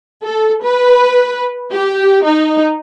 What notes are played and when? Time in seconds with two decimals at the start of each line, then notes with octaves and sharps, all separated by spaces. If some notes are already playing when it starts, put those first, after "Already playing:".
0.24 A4
0.63 B4
1.72 G4
2.24 D#4